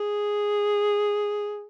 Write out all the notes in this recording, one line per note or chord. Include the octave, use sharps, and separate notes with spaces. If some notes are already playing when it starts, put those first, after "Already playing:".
Already playing: G#4